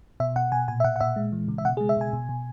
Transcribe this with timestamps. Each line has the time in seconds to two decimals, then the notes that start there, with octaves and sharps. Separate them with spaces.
0.20 B2 E5
0.36 B2 F#5
0.52 B2 G#5
0.68 A#2 G#5
0.80 E5
0.84 A#2 F#5
0.96 F#5
1.01 A#2 E5
1.16 G#3
1.32 E3
1.48 C#3
1.58 E5
1.65 B2 F#5
1.77 G#4
1.81 G#3
1.89 E5
1.97 B2 G#5
2.13 B2
2.29 B2